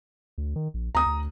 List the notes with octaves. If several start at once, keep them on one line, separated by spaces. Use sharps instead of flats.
D2
D#3
A#1
D2 A#5 D#6
D2